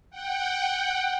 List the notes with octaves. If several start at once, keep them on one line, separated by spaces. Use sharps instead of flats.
F#5 G5